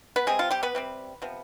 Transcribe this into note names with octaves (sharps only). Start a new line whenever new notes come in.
B3 B4
C3 G3 G#3 C4 G#4
F3 F4
G3 G4
B3 B4
C3 G3 C4
C3 F3 B3